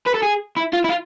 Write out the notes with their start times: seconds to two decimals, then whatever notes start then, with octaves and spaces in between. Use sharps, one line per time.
0.07 B4
0.15 A4
0.23 G#4
0.56 E4
0.73 F4
0.84 E4
0.89 F4